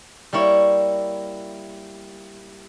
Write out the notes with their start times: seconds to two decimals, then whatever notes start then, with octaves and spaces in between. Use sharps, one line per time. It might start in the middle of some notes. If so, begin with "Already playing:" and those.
0.33 G3 A#3 E4 C#5